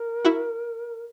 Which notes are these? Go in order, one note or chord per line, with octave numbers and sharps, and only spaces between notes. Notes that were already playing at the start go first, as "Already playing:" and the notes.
Already playing: A#4
E4 F#4